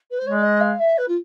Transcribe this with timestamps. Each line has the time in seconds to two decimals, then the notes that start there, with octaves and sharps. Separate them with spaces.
0.11 B4
0.19 C5
0.24 G#3 C#5
0.35 D5
0.43 D#5
0.61 F5
0.80 E5
0.98 B4
1.08 F4